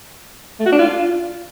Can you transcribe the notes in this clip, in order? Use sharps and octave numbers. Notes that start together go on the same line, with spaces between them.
A3
F#4
D4
F4